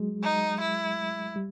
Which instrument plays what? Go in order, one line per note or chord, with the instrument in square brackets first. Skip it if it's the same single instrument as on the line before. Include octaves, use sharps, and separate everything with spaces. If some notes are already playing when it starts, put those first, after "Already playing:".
Already playing: [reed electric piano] F#3 G#3
[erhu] D#4
E4
[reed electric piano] G3